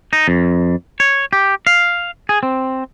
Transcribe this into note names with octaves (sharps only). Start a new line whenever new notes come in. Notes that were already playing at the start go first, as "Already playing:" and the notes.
D#4
F2
C#5
G4
F5
G#4
C4